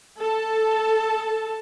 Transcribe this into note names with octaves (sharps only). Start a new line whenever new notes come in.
A4 A5